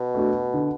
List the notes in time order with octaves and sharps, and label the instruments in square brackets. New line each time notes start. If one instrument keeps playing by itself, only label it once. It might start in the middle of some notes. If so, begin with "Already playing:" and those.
Already playing: [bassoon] B2
[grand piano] A3 D4 F#4
D3